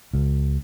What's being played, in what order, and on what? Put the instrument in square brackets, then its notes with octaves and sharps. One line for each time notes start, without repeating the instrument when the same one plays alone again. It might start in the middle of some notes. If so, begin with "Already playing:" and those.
[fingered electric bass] C#2